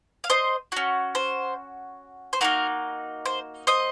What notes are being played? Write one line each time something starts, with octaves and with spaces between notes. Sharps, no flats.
F5
C5 D#5
C#4 F#4
C5
C5
A#3 D#4 F#4 A#4
C5
C5 D#5